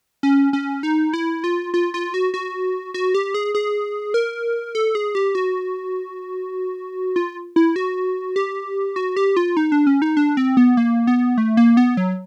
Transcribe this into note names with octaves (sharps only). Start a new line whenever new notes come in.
C#4
C#4
D#4
E4
F4
F4
F4
F#4
F#4
F#4
G4
G#4
G#4
A#4
A4
G#4
G4
F#4
F4
E4
F#4
G4
F#4
G4
F4
D#4
D4
C#4
D#4
D4
C4
B3
A#3
B3
A3
A#3
B3
F#3